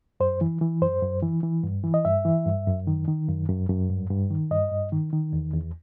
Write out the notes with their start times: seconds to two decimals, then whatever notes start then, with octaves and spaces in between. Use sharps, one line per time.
0.20 F#2 C5
0.41 E3
0.61 E3
0.82 F#2 C5
1.02 F#2
1.23 E3
1.43 E3
1.63 G2
1.84 E3
1.94 D#5
2.05 G2 E5
2.25 E3
2.46 G2
2.67 F#2
2.87 D#3
3.08 D#3
3.28 F#2
3.49 F#2
3.69 F#2
3.89 G2
4.10 G2
4.31 D#3
4.51 G2 D#5
4.72 G2
4.92 D#3
5.13 D#3
5.33 E2
5.54 E2